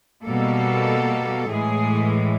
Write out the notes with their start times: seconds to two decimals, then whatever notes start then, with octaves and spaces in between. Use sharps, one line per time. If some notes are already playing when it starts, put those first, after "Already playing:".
0.24 B2 G3 A#3 A4
1.48 A2 E3 G#3 G#4